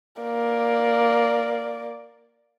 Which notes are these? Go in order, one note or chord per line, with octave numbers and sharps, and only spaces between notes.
A#3 D5